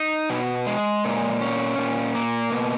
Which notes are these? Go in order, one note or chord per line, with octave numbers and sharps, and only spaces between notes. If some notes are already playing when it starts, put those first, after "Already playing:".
Already playing: D#4
B2
G#3
A#2
C#4
A#2
A#3
B2